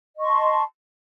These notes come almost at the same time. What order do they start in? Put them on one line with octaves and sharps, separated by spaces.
D#5 C#6 C6 A5